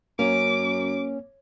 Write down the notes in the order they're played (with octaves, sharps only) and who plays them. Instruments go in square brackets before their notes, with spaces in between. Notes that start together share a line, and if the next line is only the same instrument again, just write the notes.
[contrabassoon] F#2 [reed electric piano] A#3 [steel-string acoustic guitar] C#4 [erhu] D6